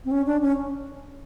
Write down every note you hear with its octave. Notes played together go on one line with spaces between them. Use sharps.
C4
C#4
D4
C#4